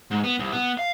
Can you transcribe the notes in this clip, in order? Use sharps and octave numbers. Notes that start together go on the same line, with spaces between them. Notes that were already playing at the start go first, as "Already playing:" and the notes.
G#2
B3
C2
B3
F5